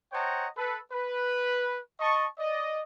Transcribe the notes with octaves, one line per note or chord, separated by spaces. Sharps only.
C5 C#5 D#5 F#5 G5 A#5
A4 B4
B4
D#5 A5 C#6
D5 D#5